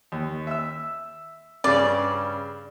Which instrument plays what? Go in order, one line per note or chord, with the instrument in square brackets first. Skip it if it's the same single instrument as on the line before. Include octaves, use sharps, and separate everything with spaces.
[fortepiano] D#2
E5 E6
[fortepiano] G2 C#3 [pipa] D5